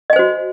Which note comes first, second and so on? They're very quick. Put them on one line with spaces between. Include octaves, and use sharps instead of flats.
D#5 G#5 C5 F#4